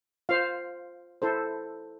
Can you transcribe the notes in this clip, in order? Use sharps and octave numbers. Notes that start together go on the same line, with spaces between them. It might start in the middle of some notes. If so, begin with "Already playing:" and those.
F4 C5 F5
E4 A4 C5